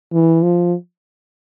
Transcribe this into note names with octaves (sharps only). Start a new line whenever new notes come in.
E3
F3